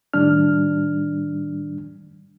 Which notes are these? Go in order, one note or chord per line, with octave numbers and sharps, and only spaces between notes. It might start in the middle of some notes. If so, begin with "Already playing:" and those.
A2 D#3 G3 D4 F6